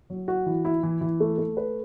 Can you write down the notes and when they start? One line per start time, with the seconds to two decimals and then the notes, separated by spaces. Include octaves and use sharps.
0.10 F#3
0.28 F#4
0.46 E3
0.65 E4
0.83 E3
1.01 E3
1.20 A3
1.38 A3
1.57 B4